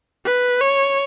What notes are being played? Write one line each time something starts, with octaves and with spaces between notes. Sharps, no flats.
B4
C#5